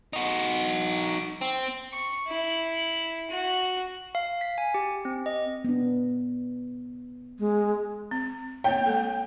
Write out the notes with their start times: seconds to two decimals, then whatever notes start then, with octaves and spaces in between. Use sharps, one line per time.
0.13 D#4 F#4
1.41 C4
1.93 C#6
2.28 E4
3.31 F#4
4.15 F5
4.41 B6
4.58 G#5
4.74 G4
5.05 C4
5.26 D#5
5.64 B3 D4
7.39 G#3
8.11 C4
8.64 A#3 C4 C#5 G5
8.86 G#3 A#3 A4